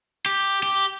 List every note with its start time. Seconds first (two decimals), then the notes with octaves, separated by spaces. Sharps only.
0.26 G4
0.63 G4